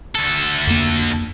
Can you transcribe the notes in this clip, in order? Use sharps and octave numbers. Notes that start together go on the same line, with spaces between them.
D2 A4
F2 A#3